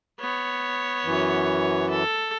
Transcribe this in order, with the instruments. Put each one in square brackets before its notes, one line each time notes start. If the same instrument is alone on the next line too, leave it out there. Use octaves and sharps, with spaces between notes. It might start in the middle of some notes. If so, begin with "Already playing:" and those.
[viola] B3 C#5
[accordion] F#2 E3
[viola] A4